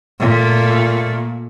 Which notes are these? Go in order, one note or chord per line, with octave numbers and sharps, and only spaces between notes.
A#2 A3